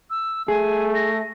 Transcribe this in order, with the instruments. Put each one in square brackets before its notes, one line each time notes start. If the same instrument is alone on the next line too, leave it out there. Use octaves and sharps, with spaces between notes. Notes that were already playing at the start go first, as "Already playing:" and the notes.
[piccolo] E6
[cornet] A3 [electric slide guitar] G#4 [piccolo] G#5
[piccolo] A#6